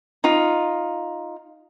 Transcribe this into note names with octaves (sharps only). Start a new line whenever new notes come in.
D#4 F4